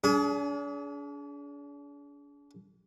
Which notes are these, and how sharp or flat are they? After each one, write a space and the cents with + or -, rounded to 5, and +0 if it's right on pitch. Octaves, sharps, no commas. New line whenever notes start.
D4 -40 G#4 +20